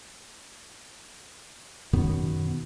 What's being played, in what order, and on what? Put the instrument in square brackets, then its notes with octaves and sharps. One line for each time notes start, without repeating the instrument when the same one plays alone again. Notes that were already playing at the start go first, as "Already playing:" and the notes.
[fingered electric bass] F#2 B2 D#3 B3